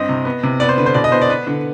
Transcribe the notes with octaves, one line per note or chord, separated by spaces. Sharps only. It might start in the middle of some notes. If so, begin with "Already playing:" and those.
Already playing: G2 C4 D#5
C3
B3
C3
B3 D5
C5
D3 B4
C5
B2 D5
D#5
B3 C5
D5
B3 B4
D3